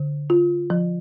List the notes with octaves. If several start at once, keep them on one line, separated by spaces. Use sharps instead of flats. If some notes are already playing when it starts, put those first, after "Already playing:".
Already playing: D3
F4
F3